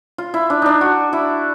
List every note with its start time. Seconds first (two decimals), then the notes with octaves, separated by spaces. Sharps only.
0.18 F4
0.34 E4
0.50 D4
0.62 D4 D#4
0.81 F#4
1.13 E4